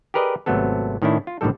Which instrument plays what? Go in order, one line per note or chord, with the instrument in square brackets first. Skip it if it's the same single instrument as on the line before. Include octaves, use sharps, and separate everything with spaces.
[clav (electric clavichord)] G4 G#4 A#4 B4 D5 D#5
G#1 C3 F#3 A3 B3 A4
A2 D#3 C#4 D4 E4
F4
A#1 A2 D3 D#3 G3 A4